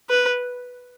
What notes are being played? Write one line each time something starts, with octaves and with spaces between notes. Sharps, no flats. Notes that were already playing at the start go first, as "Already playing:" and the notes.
B4